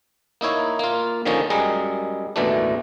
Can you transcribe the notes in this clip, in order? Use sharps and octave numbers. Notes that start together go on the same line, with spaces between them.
A#3 D#4 E4 C#5
A#3 F4
D3 D#3 F3 A#3 C#4 D#4
F#2 G3 G#3 G#4 A#5
A1 D#2 B2 E3 A3 D4